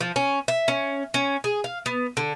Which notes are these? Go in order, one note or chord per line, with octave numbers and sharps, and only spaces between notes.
F3
C#4
E5
C#4
C#4
G#4
F5
B3
D3